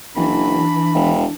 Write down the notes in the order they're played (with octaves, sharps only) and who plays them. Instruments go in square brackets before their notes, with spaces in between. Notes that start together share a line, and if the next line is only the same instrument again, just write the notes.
[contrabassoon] F#1 [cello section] E3 [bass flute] D4 [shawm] B5
[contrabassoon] E1